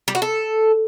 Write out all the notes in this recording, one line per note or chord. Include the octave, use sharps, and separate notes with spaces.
G3
F#4
A4